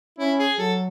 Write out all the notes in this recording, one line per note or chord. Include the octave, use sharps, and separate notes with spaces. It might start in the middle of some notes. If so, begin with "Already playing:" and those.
C#4 E4
G#4
F#3 A4